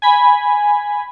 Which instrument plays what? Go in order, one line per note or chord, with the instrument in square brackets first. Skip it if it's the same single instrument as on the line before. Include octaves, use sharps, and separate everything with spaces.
[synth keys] G#5 B5